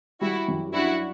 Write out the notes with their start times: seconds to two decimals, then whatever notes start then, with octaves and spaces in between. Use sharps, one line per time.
0.21 G3 E4 F#4
0.48 F#2
0.73 D4 E4 F#4